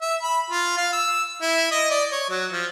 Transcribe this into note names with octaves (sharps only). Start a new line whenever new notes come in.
E5
B5
F4
F5
E6
E4
D#5
D5
C#5
F#3
F3